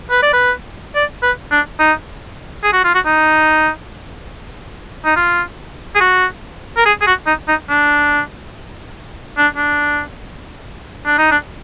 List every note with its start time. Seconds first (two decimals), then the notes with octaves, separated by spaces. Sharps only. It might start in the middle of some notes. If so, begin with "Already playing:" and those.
0.11 B4
0.22 D5
0.33 B4
0.95 D5
1.23 B4
1.52 D4
1.80 D#4
2.64 G#4
2.73 F#4
2.84 F4
2.95 F#4
3.06 D#4
5.05 D#4
5.16 F4
5.95 G#4
6.00 F#4
6.77 A#4
6.86 G#4
7.01 G#4
7.07 F#4
7.27 D#4
7.48 D#4
7.70 D4
9.38 D4
9.56 D4
11.06 D4
11.18 D#4
11.31 D4